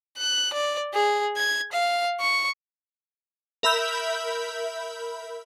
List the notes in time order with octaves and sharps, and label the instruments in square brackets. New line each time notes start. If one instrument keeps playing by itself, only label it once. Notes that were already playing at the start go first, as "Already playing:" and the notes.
[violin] F#6
D5
G#4
G#6
F5
C#6
[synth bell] A#4 E5 B5 E6 G6